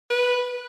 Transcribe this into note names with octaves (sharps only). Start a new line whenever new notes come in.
B4